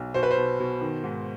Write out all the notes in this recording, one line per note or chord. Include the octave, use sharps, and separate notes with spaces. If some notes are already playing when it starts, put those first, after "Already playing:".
Already playing: B1
B2 C5
B4
C5
B2
B2
D#3
G#2